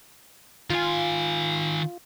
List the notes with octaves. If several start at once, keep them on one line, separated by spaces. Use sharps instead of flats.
D#3 F4 G#5